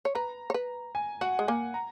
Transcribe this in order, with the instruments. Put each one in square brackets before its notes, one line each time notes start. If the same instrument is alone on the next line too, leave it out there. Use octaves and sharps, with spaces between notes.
[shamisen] C#5
[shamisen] B4 [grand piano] A#5
[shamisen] C#5
B4
[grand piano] G#5
[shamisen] F#4 [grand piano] F#5
[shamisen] G#3
[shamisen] A#3 [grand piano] G#5
[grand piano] A#5